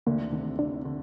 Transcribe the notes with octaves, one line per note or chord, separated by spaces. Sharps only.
D2 D3 A#3
C3 D#3
C3 D4
D3